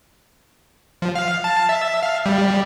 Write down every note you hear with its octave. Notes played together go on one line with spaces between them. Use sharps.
F3
F5
A5
E5
F5
G3